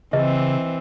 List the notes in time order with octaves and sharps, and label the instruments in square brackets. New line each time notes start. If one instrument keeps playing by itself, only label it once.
[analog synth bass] C#3 [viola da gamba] E3 C4 [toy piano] D#5